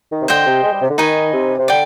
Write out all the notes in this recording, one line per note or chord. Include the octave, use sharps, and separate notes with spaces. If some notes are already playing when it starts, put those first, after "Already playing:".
D#3
C3
D3 C5 D#5 G5
C3
G#3
G3
C3
D3
D#3 D#4 B4 D#5 G#5
C3
C3
D3 D5 G5